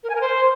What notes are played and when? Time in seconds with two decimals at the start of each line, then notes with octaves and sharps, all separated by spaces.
0.03 A#4
0.09 G#5
0.15 A#4
0.20 C5